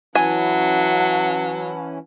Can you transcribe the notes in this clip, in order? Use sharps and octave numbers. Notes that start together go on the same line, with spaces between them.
E3 F#3 C#4 E4 F#5 G#5 A5